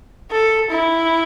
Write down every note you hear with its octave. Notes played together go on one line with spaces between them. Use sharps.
A4
E4